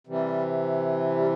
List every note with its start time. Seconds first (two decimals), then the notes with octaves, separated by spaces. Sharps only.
0.07 C3 E3 G3
1.16 G3